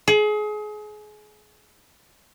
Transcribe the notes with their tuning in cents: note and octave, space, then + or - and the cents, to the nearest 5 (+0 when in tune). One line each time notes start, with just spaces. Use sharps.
G#4 +30